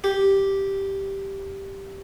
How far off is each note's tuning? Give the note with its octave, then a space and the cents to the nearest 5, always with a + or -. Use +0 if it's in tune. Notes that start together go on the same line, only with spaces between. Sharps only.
G4 -5